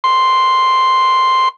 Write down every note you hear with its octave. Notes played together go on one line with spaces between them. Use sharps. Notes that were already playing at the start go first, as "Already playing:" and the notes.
C6